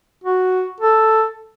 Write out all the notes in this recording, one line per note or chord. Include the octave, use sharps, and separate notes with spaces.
F#4
A4